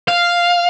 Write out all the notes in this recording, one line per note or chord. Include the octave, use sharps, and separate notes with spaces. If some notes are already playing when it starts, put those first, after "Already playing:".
F5